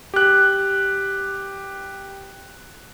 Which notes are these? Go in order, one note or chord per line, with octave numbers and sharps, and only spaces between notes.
G4 F#6